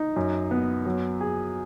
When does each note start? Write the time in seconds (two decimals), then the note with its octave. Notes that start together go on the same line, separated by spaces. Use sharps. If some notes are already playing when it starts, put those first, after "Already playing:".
Already playing: D#4
0.16 F#2
0.51 B3
0.86 F#3
1.21 G#4